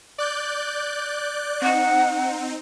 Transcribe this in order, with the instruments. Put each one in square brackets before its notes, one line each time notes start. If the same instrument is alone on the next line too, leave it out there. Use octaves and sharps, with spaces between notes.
[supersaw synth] D5 F#6 G6
[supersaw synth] C4 D#4 [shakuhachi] F#5